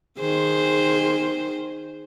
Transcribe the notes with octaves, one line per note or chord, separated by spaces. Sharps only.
D#3 G#4 C5